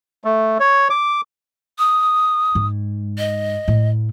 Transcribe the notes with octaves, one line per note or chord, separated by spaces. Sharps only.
A3
C#5
D6
D#6
G#2
D#5
A2